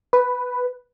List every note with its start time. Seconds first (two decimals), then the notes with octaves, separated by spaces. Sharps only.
0.13 B4